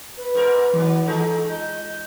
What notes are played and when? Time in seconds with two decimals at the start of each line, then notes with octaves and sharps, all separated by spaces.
0.17 B4
0.35 G#2 A#4
0.73 E3 F#3 B3
1.07 E3 G#3 D#4 A4
1.48 G6